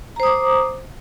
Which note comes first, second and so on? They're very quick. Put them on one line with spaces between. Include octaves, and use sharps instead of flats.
A#5 C5 D#6 D6